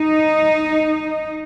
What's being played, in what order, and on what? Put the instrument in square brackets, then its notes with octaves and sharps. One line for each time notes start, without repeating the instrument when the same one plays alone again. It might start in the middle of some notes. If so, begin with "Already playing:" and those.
Already playing: [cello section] D#4